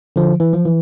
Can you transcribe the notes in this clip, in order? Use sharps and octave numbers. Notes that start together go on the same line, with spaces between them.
D3 F3
E3
F3
E3